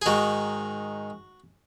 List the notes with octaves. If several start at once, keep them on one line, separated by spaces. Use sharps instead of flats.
G#4
G#2 D#3 F#4